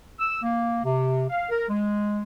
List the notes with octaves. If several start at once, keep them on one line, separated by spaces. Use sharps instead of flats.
E6
A#3
C3
F5
A#4
G#3